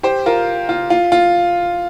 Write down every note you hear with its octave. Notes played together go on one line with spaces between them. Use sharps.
G4 C5
F4 A#4
F4
F4
F4